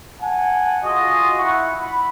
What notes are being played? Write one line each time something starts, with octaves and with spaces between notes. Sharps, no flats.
F#5 G#5 A5
F4 F#4 G#4 D#5 C#6 D#6
E4 F#5 C#6
B5